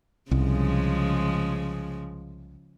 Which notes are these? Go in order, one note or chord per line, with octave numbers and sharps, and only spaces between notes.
C2 C#3 F3 G#3